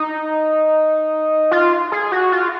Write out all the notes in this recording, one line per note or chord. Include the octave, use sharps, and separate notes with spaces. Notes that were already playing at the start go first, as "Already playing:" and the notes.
Already playing: D#4
F4
G#4
F#4
F4